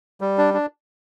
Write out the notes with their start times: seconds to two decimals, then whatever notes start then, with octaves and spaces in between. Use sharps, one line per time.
0.21 G3
0.38 D4
0.54 D4